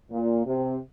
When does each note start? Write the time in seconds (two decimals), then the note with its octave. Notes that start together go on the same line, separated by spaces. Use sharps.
0.11 A#2
0.45 C3